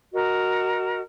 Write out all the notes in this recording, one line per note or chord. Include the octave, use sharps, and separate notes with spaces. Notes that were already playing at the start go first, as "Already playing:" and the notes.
F#4 A#4 D#5